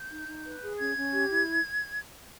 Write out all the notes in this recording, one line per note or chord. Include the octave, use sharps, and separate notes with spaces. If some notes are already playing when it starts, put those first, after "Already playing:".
Already playing: G6
D#4
D#4
B4
G#4
C#4 G#6
C#4
G4
E4